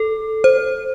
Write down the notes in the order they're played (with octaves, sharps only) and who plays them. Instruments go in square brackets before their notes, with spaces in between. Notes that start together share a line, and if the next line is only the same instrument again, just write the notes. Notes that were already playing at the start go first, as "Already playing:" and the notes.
Already playing: [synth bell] A4
C5